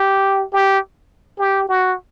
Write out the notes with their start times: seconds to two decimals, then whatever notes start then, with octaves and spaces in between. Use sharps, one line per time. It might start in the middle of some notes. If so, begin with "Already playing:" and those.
Already playing: G4
0.53 G4
1.39 G4
1.68 F#4